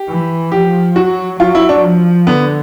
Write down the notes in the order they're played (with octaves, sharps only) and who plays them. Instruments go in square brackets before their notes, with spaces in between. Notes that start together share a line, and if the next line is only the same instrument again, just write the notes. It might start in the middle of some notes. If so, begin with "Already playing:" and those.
Already playing: [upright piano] G4
[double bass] E3
[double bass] F3 [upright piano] G4
[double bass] F#3 [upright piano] F#4
[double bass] F#3 [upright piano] F4
[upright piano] E4
D4
[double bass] F3
[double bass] D3 [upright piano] B3